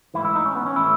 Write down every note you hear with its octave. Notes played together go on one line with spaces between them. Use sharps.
G#2 E3 A3 E4
E4
D#4
C#4
B3
C#4
A2 E3 A3 E4